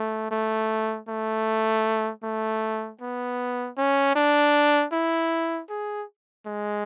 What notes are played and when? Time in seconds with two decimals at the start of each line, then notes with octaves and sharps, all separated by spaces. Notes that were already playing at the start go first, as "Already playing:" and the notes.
Already playing: A3
0.31 A3
1.08 A3
2.23 A3
3.01 B3
3.77 C#4
4.16 D4
4.92 E4
5.69 G#4
6.46 G#3